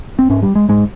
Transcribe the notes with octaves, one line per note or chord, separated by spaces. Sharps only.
C4
G#2 C#4
G3
G#3
G#2 G#3